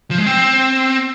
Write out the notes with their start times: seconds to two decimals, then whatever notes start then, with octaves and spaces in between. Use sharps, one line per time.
0.11 F3
0.18 G#3
0.26 C4